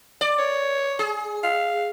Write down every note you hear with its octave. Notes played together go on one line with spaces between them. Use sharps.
D5
C#5
G#4
F5